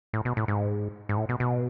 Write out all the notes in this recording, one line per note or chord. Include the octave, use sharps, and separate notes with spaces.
A2
B2
A2
G#2
G#2
A2
B2
B2